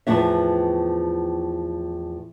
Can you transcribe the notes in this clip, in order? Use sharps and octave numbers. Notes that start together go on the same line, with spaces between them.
E2 A2 F3 B3 C#5 E5